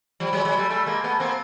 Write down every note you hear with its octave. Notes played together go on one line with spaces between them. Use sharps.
F3 G3
F#3 G#3
F#3 G#3
G3 A3
G3 A3
G#3 A#3
A3 B3
A#3 C4